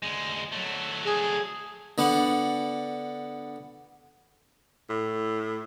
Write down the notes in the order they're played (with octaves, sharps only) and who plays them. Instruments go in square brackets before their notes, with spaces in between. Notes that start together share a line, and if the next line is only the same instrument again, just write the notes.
[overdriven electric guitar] D2 G#3
F#3 A3
[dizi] G#4
[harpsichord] D3 B3 D4
[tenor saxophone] A2